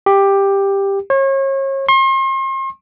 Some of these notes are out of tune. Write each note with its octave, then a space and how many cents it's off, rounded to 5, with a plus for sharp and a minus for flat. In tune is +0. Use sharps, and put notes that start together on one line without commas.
G4 +10
C#5 -35
C6 +40